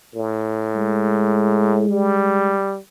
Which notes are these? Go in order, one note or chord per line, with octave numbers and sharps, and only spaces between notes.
A2
G#3
G3